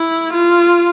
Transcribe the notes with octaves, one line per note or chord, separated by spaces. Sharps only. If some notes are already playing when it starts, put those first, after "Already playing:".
Already playing: E4
F4